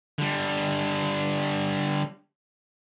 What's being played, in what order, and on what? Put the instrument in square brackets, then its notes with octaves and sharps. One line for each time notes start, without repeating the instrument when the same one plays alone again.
[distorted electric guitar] D3 G3